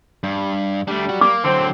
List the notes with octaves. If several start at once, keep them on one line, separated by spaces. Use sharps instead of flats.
G2
G3 A3 D4
F#3 F#4
A#3 D6
D3 F#3 C4